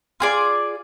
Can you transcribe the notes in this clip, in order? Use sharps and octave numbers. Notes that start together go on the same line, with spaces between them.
F4 G#4 D5